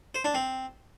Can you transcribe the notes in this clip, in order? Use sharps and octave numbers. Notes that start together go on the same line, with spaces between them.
C5
D4
C4